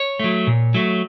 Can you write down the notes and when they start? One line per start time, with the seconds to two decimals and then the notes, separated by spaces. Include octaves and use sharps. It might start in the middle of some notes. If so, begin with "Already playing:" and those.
Already playing: C#5
0.20 F#3 A3
0.47 A#2
0.74 F#3 A3